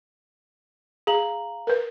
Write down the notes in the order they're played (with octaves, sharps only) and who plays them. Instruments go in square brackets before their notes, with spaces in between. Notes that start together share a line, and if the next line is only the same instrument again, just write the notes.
[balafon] G#4 [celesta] F5 A#5 F#7
[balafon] A#4 B4